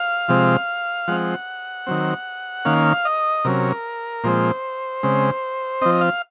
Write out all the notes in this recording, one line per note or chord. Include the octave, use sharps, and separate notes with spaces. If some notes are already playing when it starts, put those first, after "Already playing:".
Already playing: F5
C3 F3 G#3 C4
F3 G#3 C4 F#5
D#3 F#3 C4
D#3 A#3 C#4 F5
D#5
C3 F#3 C#4 A#4
A#2 F3 G#3 C4 C5
C#3 G#3 C4
F3 C4 D#5
F5